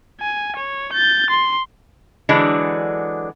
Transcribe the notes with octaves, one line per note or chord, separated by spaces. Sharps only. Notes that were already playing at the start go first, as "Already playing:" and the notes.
G#5
C#5
G6 A6
C6
D3 E3 F#3 G#3 D4